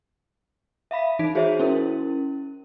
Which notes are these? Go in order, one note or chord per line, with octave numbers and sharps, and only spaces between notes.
E5 F5 B5 B6
E3 D#4 B6 D7
F#4 G#4 C5 C#5 E5
C#4 E4 A#4